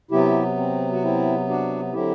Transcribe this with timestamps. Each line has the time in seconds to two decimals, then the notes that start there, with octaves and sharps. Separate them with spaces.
0.11 C3 F#3 B3 E4 G4
0.57 C4
0.93 F#4
1.02 C4 E4
1.48 D4 F#4
1.93 D3 F#3 C4 E4 G4